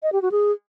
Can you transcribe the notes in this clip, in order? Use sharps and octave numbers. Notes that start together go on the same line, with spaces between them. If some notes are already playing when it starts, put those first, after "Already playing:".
D#5
G4
F#4
G#4